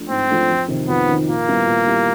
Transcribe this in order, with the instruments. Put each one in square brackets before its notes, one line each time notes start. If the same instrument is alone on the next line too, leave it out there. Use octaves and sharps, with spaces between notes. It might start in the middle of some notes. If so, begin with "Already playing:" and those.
Already playing: [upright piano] F3 A3 D4
[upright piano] G#2 [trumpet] C4
[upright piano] F3 A3 D4
F2
C3 D#3
[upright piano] F2 [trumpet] B3
[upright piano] C3 D#3
[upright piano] A#2 [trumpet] A#3
[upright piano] G3 B3 E4 G4
A#2
G3 B3 E4 G4